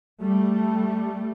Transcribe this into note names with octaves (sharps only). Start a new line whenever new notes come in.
G3 A3